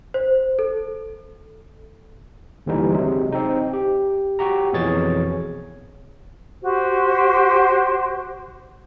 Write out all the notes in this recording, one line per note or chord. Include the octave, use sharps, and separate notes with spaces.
C5
A4
D#2 D3 E3 G3 D#4
C3 F#3 G#3
C4 D#4
G4
F#4 G4 A#5
F2 B2 E3 G#4 C#5 A6
F#4 G4 C5